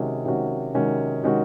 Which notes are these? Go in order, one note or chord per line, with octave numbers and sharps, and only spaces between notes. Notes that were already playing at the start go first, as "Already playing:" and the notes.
Already playing: C3 D#3 G#3 C#4 F#4
C3 D#3 G#3 C#4 F#4
C3 D#3 G#3 C#4 F#4
C3 D#3 G#3 C#4 F#4